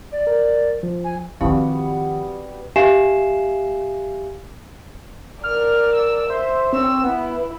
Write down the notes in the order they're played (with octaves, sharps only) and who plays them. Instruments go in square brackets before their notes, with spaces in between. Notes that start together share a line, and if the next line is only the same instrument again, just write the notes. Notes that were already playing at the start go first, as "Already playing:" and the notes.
[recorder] D5
[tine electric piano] A#4
F3
[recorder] G#5
[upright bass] D#3 F3 [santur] G3 B3 F#4 [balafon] C4 E4 F5
[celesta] G4 E5 F5 G#5 C7 E7
[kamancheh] A#4 D5 [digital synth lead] F6
[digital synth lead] E6
[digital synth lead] C5 [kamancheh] E5
[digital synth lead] C4 [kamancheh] C#5 E6
[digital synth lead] B3 [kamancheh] E4